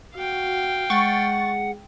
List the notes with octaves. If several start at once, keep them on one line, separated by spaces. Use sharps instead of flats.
F#4 F5 G5
G#3 F#5 C#6 A6